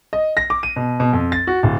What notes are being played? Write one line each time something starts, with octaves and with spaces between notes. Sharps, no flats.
D#5
A#6
D6
D#7
B2
B2
F2
A6
F#4
D1